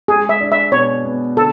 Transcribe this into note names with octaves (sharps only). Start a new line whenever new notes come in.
G#3 G#4
E5
D4
E5
B2 C#5
B3
D3 A4